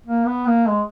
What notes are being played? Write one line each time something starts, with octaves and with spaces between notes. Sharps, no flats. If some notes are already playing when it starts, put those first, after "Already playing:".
A#3
B3
A#3
G#3